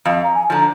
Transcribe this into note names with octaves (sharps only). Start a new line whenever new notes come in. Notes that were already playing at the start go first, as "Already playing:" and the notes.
F2 F5
A#5
G#5
D3 F3 A#5